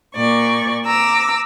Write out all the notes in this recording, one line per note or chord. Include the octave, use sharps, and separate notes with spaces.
A#2 D5 C#6
A#5 D6 E6